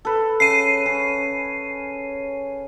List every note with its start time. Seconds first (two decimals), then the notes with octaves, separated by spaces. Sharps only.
0.05 A4 B4
0.40 C#3 C7 D#7
0.86 C#4